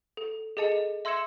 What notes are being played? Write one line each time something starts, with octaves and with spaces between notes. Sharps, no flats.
A4
G#4 A4 D#5 A5 C#7
D#5
E5 C6 E6 G#6 C#7 E7